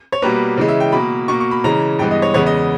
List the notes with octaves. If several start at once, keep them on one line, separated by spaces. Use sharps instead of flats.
C#5
B2 G3 A#3 B4
C#3 E3 G#3
E5
G5
B2 A#3 B5
B2 A#3 C#6
C#6
B5
C#3 E3 G#3 A#5
G2 E3 G#3 B3 G5
D#5
C#5
E2 C#3 G#3 B3 C#5
D#5